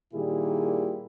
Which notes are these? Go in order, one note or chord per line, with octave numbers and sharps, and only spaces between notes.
A#2 D#3 G3 E4 G4 G#4